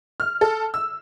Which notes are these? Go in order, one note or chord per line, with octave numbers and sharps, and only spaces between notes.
F6
A4
E6